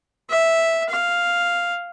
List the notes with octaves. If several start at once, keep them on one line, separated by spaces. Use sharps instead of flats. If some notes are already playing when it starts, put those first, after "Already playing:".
E5
F5